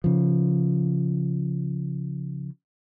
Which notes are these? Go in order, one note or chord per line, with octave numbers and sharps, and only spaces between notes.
C#3 F3